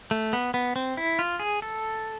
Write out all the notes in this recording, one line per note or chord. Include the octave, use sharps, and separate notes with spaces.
A3
B3
B3
C4
E4
F4
G#4
A4